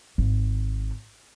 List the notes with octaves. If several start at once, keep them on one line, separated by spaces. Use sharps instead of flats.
G#1